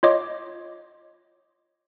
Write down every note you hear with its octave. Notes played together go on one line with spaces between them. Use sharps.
F4 C#5 D#5 D6